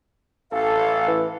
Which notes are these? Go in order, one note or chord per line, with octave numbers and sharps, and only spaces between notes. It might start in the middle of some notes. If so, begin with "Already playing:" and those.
A1 A4 F5
E3